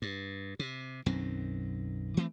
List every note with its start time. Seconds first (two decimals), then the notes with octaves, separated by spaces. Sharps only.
0.02 G2
0.59 C3
1.06 B1 F#2 D#3 C4
2.17 E3 A3 C4